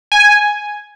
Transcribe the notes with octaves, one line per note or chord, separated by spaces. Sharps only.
G#5